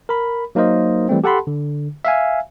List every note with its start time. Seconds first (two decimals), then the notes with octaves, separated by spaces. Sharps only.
0.09 A#4 B5
0.55 F#3 A#3 D#4 A#4 C5 D#5
1.09 E3 G3 A3 C4
1.24 G4 A4 F#5 A5 B5 C6
1.47 D3
2.05 E5 F5 G#5